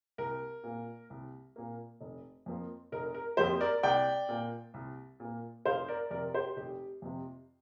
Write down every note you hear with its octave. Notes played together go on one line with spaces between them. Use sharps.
C2 A#4
A#2 A#3
C2
A#2 A#3
F1
F2 F3 A#3
F1 A#4
A#4
F2 F3 A#3 G4 C5
A#4 D5
C2 D5 G5
A#2 A#3
C2
A#2 A#3
F1 C5 F5
A#4 D5
F2 C3 A#4 D5
G4 C5
F1 G4
F2 C3